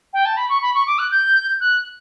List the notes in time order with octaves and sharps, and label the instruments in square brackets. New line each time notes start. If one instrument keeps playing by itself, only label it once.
[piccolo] G5
A5
B5
C#6
B5
C#6
D6
F#6
G6
F#6